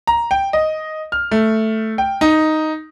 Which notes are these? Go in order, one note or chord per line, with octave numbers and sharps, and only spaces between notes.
A#5
G5
D#5
F6
A3
G5
D#4